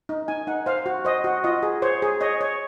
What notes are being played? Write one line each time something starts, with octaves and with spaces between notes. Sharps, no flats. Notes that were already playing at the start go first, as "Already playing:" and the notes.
D#4
D#4 G#5
D#4 F#5
C5 F5
F#4
C5 D#5
F#4
F4 D#5
G#4
C5 C#5
G#4
C#5 D#5
C#5